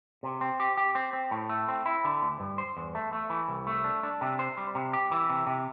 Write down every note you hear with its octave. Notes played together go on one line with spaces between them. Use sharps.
C3
C4
G4
G4
C4
C4
A2
A3
C4
E4
D3
D2
G2
C5
E2
A3
A3
E3
C2
A3
D4
D4
C3
C5
G3
C3
G4
E3
C3
C3